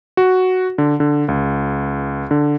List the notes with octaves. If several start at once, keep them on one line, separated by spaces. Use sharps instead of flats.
F#4
D3
D3
C#2
D3